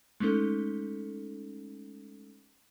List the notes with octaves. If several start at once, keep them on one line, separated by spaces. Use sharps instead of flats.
G#3 A3 C#4 D#4 A4